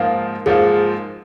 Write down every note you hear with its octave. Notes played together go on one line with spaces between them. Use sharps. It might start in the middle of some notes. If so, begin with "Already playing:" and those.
Already playing: G#2 F3 A#3 F4
G#2 F3 A#3 F4 G#4